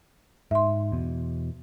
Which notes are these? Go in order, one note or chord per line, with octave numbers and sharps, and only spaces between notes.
G#2 E5 C6
E2 B2